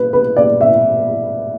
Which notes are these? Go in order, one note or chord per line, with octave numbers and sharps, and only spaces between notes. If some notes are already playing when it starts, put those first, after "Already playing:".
Already playing: B4
B4
D5
E5